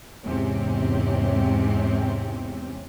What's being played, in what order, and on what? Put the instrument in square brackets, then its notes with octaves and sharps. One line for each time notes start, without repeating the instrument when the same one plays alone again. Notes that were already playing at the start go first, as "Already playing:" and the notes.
[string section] E2 G#2 C3 C4 C#4 G4